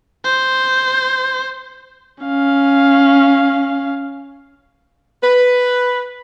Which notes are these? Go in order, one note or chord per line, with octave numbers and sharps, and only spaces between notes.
C5
C#4 F5
B4